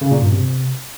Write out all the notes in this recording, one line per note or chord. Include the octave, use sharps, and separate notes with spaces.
C#3
A#2
G2
C3